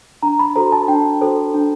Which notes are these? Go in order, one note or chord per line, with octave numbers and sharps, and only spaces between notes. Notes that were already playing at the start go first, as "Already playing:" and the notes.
D4 A#5
B5
F#4 A4 C5 A#5
A5
D4 G5
F#4 A4 C5
D4